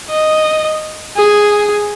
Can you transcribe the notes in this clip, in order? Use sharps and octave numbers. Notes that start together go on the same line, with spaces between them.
D#5
G#4